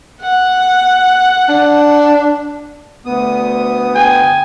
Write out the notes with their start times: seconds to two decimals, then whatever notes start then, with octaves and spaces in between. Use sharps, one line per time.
0.22 F#5
1.49 D4
3.06 D2 B3 D#6
3.95 G5 G#5